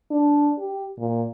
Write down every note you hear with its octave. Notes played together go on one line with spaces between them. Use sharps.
D4
G4
A#2